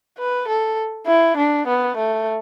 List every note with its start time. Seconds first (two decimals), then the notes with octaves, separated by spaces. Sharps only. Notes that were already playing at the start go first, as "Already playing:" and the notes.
0.18 B4
0.47 A4
1.06 E4
1.37 D4
1.67 B3
1.96 A3